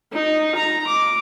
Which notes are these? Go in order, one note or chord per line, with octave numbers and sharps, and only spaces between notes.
D#4
A#5
D6